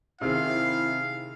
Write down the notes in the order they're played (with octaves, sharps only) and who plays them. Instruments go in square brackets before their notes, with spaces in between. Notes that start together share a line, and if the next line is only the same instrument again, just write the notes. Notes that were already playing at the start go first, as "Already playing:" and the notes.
[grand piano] C3 D#3 G#4 [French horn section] E4 [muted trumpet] F5